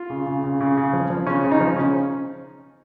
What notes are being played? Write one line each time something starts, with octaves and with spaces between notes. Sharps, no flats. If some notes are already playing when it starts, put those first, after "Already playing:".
Already playing: F4
C#3
C#3
C#3
C#3
C#3
F3
F3
C#3 C#4
C#3
D#4
F3
C#3 C#4